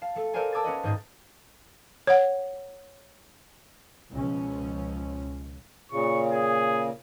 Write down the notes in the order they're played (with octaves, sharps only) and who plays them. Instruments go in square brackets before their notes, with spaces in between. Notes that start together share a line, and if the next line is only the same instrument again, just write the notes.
[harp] F5 A5
A3 A4
A4 A#4 C5 D5 F5 G#5
A#4 A5 D6 E6 G#6 A6
C#4 F#4 B4 D#5
D#1 G#2 G#4 D#5 G6 A6
[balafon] C#5 F#5
[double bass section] C#2 B2 F3 C#4
[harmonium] A#2 C#3 [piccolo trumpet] C#6
[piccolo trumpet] G#4